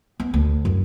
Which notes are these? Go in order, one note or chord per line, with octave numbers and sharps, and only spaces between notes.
B3
D2
F#2